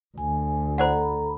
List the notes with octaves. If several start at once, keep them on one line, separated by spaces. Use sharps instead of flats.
D2 G#5
A4 C5 D5 F#5 A#5 B5